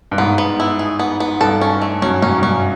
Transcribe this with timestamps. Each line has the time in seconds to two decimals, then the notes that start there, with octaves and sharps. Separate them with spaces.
0.11 G2
0.18 G#2 B3
0.38 B3
0.60 E4
0.79 G#4
0.99 B3
1.20 B3
1.41 G2 A4
1.61 C#4
1.82 A3
2.02 F#2 C#4
2.22 F#2 C#4
2.38 G2
2.43 F#2 C#4